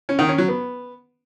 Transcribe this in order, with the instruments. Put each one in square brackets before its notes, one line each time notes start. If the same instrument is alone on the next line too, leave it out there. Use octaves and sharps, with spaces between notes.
[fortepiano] C#4
D#3
C#4
F#3
B3